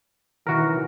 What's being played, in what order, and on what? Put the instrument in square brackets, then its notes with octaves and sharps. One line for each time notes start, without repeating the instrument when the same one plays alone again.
[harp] B2 D#3 C#4 [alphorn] E3 [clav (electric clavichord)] F#4 A#4